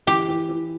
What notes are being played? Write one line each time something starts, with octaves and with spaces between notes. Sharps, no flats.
E3 G4
E3
E3